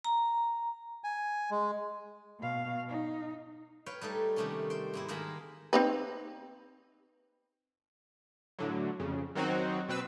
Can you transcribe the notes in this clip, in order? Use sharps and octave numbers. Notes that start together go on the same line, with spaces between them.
A#5
G#5
G#3
B2 F5
D#4
B4 C#5 F5 G5
G3 A3 D#4 A4
C3 D#3 G3 A3 A#3 C#4
C5 G5
G#2 A#3 E4
D#3 G#3 A#3 A#4 A5 B5
C4 D#4 B4
A2 D3 F#3
F2 C#3
D#3 F#3 C4 D#4 F#4
B2 C4 B4 E6